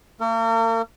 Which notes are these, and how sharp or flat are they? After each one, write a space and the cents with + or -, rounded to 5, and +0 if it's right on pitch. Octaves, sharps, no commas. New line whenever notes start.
A#3 -40 A#4 -45